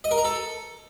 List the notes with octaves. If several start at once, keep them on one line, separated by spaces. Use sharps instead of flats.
D#5
A#4
A#5
A4